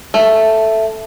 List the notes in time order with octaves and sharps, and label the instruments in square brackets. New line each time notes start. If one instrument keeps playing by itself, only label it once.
[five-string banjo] A3